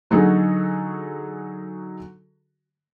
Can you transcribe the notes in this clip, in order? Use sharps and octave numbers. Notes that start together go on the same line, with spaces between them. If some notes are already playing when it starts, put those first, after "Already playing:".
D3 F#3 D#4 F#4 G#4 A4